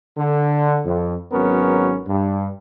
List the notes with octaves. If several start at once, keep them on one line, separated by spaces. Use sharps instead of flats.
D3
F2
G#1 F#3 B3 C#4 A#4
G2